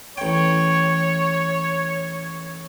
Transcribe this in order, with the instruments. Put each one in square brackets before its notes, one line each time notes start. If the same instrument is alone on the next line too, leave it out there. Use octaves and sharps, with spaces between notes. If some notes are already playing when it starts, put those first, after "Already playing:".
[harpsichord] A1 G5 [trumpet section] C#5